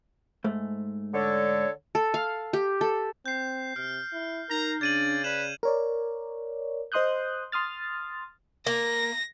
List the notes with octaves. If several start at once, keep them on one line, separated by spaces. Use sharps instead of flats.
G#2 A3
D3 A4 C#5
A4
F5
G4
A4
C4 G6 C7
C3 F6
E4
D#4 A#4 A#5
C#3 D4 D5 G#6 D#7 F#7
B4 D5 E7 F#7
A#4 C#5 D5
C5 D#5 C6 D#6 F#6 G6
C6 D#6 F6 A6
A#3 A#6